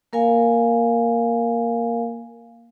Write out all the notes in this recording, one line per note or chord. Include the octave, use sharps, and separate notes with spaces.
A#3 A#4 F5 G#5